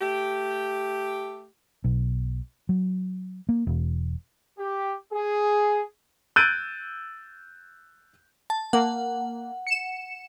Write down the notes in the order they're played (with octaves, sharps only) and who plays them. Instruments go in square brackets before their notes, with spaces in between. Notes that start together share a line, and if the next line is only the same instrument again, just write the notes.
[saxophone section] A3 G4
[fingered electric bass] B1
F#3
A#3
E1
[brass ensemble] G4
G#4
[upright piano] E6 F#6 G6 A6 D7 D#7
[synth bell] A5
[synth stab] A#3 [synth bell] F#5
[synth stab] C#7 E7